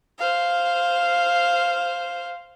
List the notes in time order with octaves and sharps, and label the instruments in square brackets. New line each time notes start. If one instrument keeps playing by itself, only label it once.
[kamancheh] C5 F5